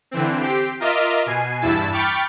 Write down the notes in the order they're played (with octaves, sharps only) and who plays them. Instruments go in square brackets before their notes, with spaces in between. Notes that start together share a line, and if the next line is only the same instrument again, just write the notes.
[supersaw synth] D3 E3 C4
C4 G4 C7 D7
F4 A#4 D#5 E5 D6 F6
B2 G#5 C7
E2 G2 E4 A5 E6
G5 B5 C#6 D6 F6 A6